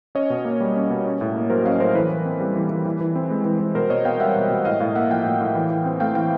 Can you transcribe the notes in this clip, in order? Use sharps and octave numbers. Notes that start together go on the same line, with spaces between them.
C#4 C#5 D#5
B2
A#3
G3
C#4
B2
C#4
A2
A#3
F#3 A#4 C5
C#4 D#5 F5
A2 A#4 C5
E3 A4 B4
E3
C4
G3
E3
E3
E3
E3
C4
G#3
E3
E3
B2 A#4 C5
B2 C#5 D#5
B3 F5 G5
G3 E5 F#5
B2
B2
A2 D#5 F5
A2 D#5 F5
A#3 E5 F#5
F3 F5 G5
A2
A2
E3
E3
C4
A3 F5 G5
E3 F5 G5